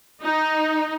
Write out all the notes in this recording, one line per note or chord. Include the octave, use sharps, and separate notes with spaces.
D#4